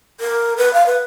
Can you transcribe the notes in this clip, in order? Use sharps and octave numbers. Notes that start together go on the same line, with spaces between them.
A#4
B4
F5
B4